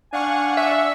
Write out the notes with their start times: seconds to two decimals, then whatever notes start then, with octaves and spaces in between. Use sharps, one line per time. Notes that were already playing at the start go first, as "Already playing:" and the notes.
0.13 D4 F5 F#5 G#5 C#6
0.57 E5